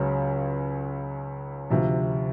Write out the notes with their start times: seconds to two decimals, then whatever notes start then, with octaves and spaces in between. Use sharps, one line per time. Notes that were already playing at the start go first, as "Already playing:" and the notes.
Already playing: C#2 C#3 F#3
1.70 D2 C3 F3